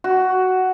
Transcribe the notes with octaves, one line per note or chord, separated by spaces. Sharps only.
F#4